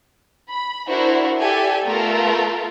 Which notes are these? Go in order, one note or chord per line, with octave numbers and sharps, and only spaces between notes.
B5
D4 E4 F#4 A#4 C5
G4 A4 D5 E5 G#5
A3 B3 F4 A4 A#4